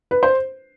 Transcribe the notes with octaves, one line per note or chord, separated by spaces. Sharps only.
B4
C5